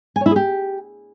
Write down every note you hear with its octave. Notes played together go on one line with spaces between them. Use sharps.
G#5
C#5
E4
G#4
G4